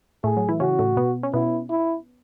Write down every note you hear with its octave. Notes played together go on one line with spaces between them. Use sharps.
A2 A3 G#4
F#3
E3 E4
C#3 C#4 F#4
A2 A3
B2 B3
C#4
B2 B3 E4
E4